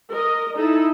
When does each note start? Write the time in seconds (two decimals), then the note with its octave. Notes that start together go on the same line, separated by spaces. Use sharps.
0.11 A#4 D#5
0.57 D#4 E4 A4